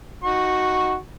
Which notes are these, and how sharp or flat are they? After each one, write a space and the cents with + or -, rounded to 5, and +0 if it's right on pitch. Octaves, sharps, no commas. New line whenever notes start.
D#4 +0 F#4 +0 C#6 -10